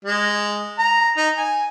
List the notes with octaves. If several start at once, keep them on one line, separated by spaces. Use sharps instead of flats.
G#3
A#5
D#4
G#5